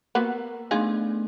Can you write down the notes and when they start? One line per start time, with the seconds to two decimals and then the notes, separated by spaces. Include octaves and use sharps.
0.15 A#3 B3 F#4 A#4
0.71 A3 B3 D4 D#4 F4 G#4